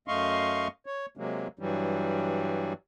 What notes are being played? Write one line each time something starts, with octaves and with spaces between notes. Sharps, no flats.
F#2 A3 D#5 F5 C6 C#6
C#5
C3 F#3 G#3 A#3
G2 E3 F#3 G3